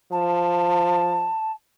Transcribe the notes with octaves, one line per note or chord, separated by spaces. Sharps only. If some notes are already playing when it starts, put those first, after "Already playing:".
F3 A5